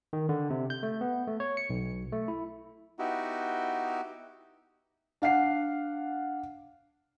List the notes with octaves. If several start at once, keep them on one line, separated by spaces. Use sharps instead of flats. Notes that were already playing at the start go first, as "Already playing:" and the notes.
D#3
D3
C3
G6
A3
B3
A3
C#5
C#7
B1
A3
E4
B3 D#4 E4 F#4 G4
D4 F5 F#5 C7